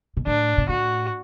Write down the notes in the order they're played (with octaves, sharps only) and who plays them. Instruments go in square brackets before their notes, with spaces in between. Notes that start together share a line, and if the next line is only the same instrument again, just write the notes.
[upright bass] B2
[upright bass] A2 [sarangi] D4
[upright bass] B2
[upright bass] A2 [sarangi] F#4